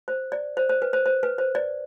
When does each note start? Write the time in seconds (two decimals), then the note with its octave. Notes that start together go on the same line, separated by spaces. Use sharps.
0.08 C5
0.32 D5
0.57 C5
0.69 C5
0.82 B4
0.93 C5
1.06 C5
1.23 B4
1.38 C5
1.55 D5